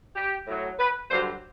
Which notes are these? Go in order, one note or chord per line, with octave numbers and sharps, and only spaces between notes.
G4
A2 F#3
B4
G2 D3 F#3 C5